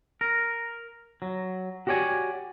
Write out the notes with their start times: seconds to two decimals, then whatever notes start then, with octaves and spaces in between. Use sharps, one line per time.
0.21 A#4
1.22 F#3
1.87 F#4 G4 C#5 D5 G#5